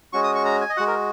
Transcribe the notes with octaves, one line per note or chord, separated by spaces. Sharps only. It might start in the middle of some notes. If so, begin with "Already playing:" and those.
G#3 C#4 F#4 C#6
D#6
C#6
A#5
G#5
D#5
G#3 F#4 F#5
A#4